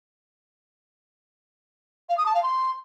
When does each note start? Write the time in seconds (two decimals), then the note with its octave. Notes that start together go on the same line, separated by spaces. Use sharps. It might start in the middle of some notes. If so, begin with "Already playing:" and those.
2.09 F5
2.18 D#6
2.26 A5
2.34 F5
2.43 C6